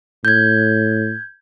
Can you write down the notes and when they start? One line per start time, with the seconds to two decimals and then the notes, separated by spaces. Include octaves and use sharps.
0.25 A2 G6 G#6